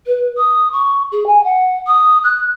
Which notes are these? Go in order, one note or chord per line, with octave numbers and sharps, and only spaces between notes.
B4
D#6
C#6
G#4
G#5
F#5
D#6
F#6